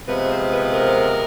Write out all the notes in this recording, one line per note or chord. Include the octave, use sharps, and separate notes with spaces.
C3 F3 G#3 B3 B4
C5
B4
A#4